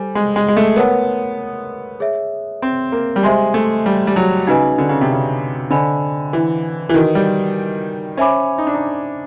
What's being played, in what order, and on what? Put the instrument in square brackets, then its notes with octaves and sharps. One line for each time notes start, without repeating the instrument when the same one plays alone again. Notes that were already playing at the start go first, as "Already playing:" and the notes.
Already playing: [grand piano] G3 [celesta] A4 C5 G#5
[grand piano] G#3
G#3
G#3
A3
[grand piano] B3 [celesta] A#4 C#5 F#5 A5
[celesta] G#4 C#5 E5
[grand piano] C4
A#3
G3
[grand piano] G#3 [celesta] G4 C5 E5 G#5 C6
[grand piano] A3
G3
G3
F#3
[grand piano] C#3 [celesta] D#4 F#4 B4 D#5 G#5
[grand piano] D3
C#3
C3
C#3
[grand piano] D3 [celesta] C5 D#5 G#5 B5
[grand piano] E3
E3
[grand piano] D#3 [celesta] F#4 B4 D#5
[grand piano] G3
[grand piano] C#4 [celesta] C5 E5 G#5 B5 D6
[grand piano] D#4
D4
D#4